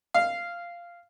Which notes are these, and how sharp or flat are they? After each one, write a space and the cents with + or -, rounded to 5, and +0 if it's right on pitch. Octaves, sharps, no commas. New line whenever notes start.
F5 -10